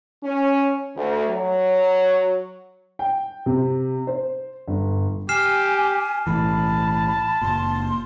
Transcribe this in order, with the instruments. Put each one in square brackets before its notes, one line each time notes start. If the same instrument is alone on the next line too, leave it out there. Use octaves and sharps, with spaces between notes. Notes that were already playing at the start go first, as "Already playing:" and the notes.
[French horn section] C#4
D2
F#3
[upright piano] G5
C3
C5
G1
[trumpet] G4 [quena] G#5 [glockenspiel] F6 C7 E7
[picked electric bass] B1 A2 E3 [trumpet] A5 [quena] B5
[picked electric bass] F#1 A#2 [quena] C6